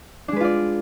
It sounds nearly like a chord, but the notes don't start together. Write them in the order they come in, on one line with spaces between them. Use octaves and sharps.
D4 G#3 B4 F4 D5